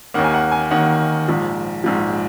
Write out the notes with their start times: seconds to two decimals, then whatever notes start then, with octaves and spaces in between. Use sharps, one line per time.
0.14 D#2 D#3 A#3 F#5
0.24 G#5
0.34 F#5
0.52 G#5
0.71 D#2 D#3 A#3 F#5
1.28 A#1 G#2 F3
1.84 A#1 G#2 F3